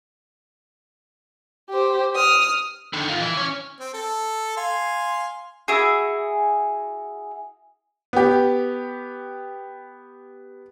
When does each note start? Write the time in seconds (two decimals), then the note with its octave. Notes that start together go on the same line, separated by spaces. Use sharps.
1.70 G4 C5
2.15 D#6 F6
2.93 D3 D#3
3.08 D#4 F4
3.21 E3
3.37 C#4 C#5
3.80 C4
3.94 A4
4.57 F5 G#5 C6
5.68 E4 F#4 G#4
8.13 B3 G4